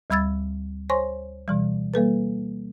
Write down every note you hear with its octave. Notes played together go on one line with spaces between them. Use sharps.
D2 G3 B5 E6 G#6 A6
C5 C#5 G#5 C6 C#6
B2 E3 G3
G3 A#3 A4 B4